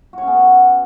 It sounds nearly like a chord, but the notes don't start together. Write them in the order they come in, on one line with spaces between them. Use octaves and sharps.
F#4 C#5 C#4 B3